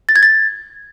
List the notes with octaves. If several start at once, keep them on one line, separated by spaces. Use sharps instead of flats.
A6
G#6
A6